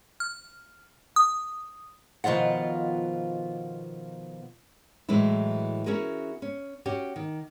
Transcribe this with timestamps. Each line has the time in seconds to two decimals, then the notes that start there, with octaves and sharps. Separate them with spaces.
0.20 F6
1.16 D#6
2.24 B2 D#3 F3 F4 F#5
5.09 A2 E3 F#3 G#3 E4
5.86 C#4 E4 F#4 G#4 A#4
6.42 C#4
6.86 C#4 F#4 G4
7.16 D#3